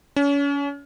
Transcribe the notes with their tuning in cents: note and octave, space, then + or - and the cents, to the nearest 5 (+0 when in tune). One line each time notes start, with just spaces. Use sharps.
C#4 +35